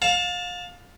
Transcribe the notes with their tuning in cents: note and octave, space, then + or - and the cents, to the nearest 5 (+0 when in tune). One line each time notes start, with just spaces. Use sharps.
F5 +30 A5 +0